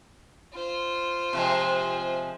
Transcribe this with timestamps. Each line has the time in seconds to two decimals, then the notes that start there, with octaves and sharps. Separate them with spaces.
0.54 F4 C5
1.33 C3 F3 G#3